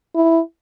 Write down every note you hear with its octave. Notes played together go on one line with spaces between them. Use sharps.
E4